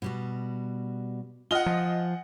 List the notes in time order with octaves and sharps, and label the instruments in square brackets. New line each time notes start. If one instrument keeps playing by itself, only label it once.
[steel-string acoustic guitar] B2 G3 F#4
[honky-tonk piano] F4 D#5 F6 [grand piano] F#5 G7 [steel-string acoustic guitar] G#5
[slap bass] F3